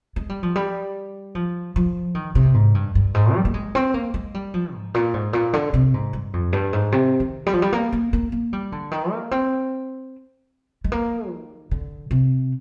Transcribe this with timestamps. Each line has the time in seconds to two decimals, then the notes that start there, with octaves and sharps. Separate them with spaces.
0.16 G#3
0.29 G3
0.43 F3
0.55 G3
1.35 F3
1.76 F3
2.15 D#3
2.35 C3
2.54 G#2
2.75 G2
2.95 G2
3.14 G#2
3.34 G3
3.45 A#3
3.54 G#3
3.75 C4
3.94 A#3
4.14 G#3
4.34 G3
4.54 F3
4.74 G#2
4.94 A#2
5.14 G#2
5.33 A#2
5.53 D3
5.74 C3
5.94 G#2
6.13 G2
6.33 F2
6.53 G2
6.73 G#2
6.92 C3
7.20 D#3
7.46 G3
7.53 F3
7.62 G3
7.73 A#3
7.92 A#3
8.13 A#3
8.32 A#3
8.53 G3
8.72 D3
8.91 D#3
9.12 A#3
9.31 C4
10.84 G#3
10.92 A#3
11.31 D#3
11.71 D3
12.11 C3